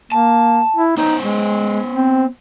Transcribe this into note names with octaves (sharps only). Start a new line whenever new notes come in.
A#3 A5
E4
B3 D#4 C5 C#5
G#3
C4